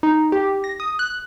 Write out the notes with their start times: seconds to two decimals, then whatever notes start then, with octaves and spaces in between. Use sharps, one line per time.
0.03 D#4
0.32 G4
0.64 A#6
0.80 D#6
0.99 F#6